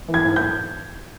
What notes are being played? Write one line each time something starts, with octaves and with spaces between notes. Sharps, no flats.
E3
G#6
G#2
G6